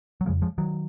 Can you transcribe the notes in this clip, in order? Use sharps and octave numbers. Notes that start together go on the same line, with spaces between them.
F#3
F2 C#3 F3 G#3
F3 G#3
D#3 F#3